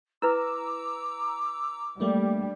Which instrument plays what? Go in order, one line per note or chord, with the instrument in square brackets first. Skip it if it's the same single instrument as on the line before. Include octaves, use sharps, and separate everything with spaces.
[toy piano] E4 B4 [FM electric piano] A#5 E6 [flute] D6
[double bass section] G3 [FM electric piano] A3 A#3 D4